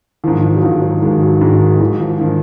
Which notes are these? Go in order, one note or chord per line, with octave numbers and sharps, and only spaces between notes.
G#2 D#3 F3
F3
F#3
G#2 D#3 F3
F#3
G#2 D#3 G#3
F#3
G#2 D#3 G#3
G#2 D#3 F#3
F3
D#3 F3